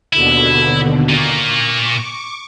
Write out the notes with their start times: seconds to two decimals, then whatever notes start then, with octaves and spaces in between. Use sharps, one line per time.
0.13 D#2 B2 D3 E4
1.09 A#2 A#3 C#6 D6